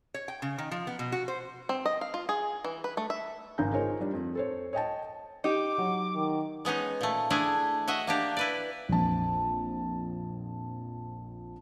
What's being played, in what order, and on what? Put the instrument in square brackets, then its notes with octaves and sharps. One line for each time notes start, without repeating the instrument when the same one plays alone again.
[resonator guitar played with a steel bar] C#5
G5
C#3
D#3
F3
B3
B2
F#4
C5
[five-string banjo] C4
D#5
F5
F4
G#4
E3
B4
A3
E5
[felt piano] G#1 C#3 F5 G#5 A#5 G6
D#4 F4 G#4 A#4 C5 C#5
G3 D4
F2
A4 C5 C#5
C#5 D#5 G5 A5
[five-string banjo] D#4 G4 [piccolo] D6
[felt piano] F#3
[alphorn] D#3
[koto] G#3 B3 C#4 D#4
A#2 A3
A3 D4 E4 G#4
F#4 D#5 E5 F#5
A#3 D4 G4
E4 B4 D5
[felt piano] A#1 F2 A5